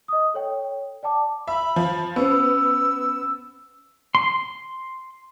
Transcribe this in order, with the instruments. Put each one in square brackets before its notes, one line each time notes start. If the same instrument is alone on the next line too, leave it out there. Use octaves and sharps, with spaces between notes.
[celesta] D#5 D#6
A4 C#5 G5
D5 G5 A5 D6
[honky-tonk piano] E5 [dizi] B5
[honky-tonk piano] F3
[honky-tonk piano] B3 [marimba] C#4 C5 [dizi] E6
[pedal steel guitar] C6